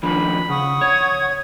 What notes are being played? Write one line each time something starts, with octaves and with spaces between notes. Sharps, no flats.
D#3 F3 D4 B5
C#3 F#5 C#6 D#6
C#5 G#6